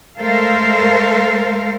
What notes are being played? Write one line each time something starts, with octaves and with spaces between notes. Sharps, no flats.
G#3 A3 A4 A#4 C5 F5